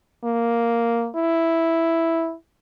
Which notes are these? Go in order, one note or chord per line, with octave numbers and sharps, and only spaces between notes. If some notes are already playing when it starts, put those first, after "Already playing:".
A#3
E4